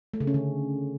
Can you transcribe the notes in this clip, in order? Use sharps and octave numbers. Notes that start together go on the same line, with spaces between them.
A3
C#3
C#4
D3